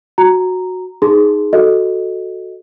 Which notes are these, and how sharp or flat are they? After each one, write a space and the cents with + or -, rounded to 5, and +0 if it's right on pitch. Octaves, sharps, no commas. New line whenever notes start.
F#4 -10 A#5 -5
D#4 +0 G#4 +0 C6 +0
F#4 +0 A4 +0 D#5 +0